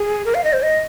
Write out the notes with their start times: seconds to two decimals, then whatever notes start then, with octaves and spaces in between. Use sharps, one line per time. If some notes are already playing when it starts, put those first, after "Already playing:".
Already playing: G#4
0.25 A#4
0.35 F5
0.44 D#5
0.53 C5
0.63 D#5